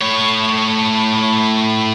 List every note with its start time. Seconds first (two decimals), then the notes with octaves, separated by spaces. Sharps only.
0.01 A2 C#5